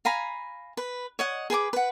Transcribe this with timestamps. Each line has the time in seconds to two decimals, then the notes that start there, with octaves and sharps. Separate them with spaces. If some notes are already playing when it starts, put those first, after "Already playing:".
0.05 F5 G#5 A#5 B5
0.77 B4
1.19 C#5 D#5 F#5
1.50 G#4 B4 G#5 D6
1.73 B4 F#5